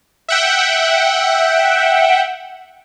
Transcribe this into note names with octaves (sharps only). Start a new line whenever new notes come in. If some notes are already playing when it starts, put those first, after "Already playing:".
E5 F#5 G5